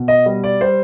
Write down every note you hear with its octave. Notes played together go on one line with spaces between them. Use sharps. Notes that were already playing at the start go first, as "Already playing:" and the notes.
Already playing: B2
D#5
G3
D5
G3 C5